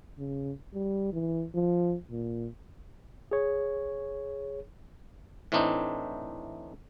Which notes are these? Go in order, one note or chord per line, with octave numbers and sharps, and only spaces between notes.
C#3
G3
E3
F3
A#2
G#4 C#5
A2 E3 A3 C4 D4 D#4